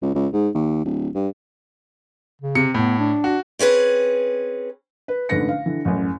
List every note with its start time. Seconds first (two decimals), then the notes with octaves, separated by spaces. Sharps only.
0.02 C#2
0.15 C#2
0.33 G#2
0.55 D#2
0.85 D1
1.15 G2
2.42 C#3
2.55 C3 C#7
2.74 A2 B3
2.99 D4
3.24 F#4
3.59 C4 C#4 G#4 B4
5.08 B4
5.29 A1 G#2 D3 B4 A#6 C#7
5.49 F5
5.66 D3 E3
5.85 A1 F#2